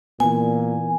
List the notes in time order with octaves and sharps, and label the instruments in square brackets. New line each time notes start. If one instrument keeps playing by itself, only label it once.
[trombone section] A#2 [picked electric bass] E3 B3 [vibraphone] G#5